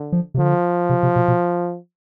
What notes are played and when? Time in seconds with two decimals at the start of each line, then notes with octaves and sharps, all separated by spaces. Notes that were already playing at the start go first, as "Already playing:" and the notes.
Already playing: D3
0.12 F3
0.34 C3
0.38 D3 F3
0.89 C3
1.03 C3
1.16 B2
1.28 B2